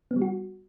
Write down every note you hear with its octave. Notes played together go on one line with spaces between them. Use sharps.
B3
G3
F#4